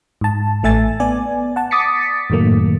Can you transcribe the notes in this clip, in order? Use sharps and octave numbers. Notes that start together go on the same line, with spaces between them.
G#2 A5
A1 A3 E5 G#5 A6
B3 D5 G#5
F#5 A5
D6 D#6 A6 B6 C#7
F#2 A2 D#3 F#3 A3 A#3